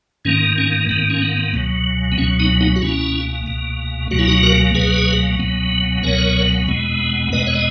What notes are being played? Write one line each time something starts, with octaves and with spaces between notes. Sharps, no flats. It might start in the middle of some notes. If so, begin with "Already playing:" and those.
G#2 D#3 A#3 C#4
C#4
G#2 D#3 A#3 B3
C#4
B3
C#2 B2 F#3
B3
C#2 B2 F#3 C#4
B3 D#4
B3 D#4
F#4
C#2 B2 A#3 C#4 E4
C#2 B2 A#3
C#2 B2 F#3 A#3 F#4
E4
D#4 F#4
F#4 A#4
C#2 B2 F#3 A#3 G#4 B4
C#2 B2 F#3 B3
C#2 B2 F#3 B3 A#4 C#5
E2 B2 G#3 B3
E2 B2 G#3 B3 B4 D#5
C#5
D#5